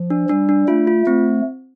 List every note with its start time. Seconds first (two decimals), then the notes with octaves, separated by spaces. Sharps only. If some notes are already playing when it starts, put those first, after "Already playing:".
Already playing: F3
0.10 D4
0.29 G3 D4
0.49 D4
0.68 A3 F4
0.87 F4
1.07 A3 C4